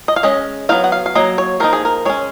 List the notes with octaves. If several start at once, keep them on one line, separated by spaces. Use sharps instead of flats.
D#5
F5
G#3 C#4 D#5
F#3 B3 D#4 F5
F#5
F5
F5
F#3 A#3 D#5
C#5
F3 A#3 D#4 A#4
G#4
A#4
G#3 C#4 C#5